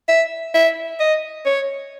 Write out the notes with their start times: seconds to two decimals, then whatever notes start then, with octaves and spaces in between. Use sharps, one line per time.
0.09 E5
0.54 E5
1.00 D#5
1.46 C#5